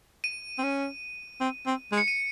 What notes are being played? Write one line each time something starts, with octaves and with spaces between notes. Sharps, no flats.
D#7
C4
C#4
C4
C4
G#3
C#7
D#7